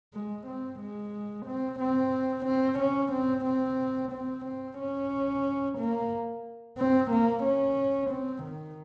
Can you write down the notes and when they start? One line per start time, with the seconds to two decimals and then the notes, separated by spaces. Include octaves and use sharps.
0.14 G#3
0.47 C4
0.80 G#3
1.46 C4
1.80 C4
2.46 C4
2.80 C#4
3.13 C4
3.46 C4
4.12 C4
4.46 C4
4.79 C#4
5.79 A#3
6.79 C4
7.12 A#3
7.44 C#4
8.11 C4
8.44 D#3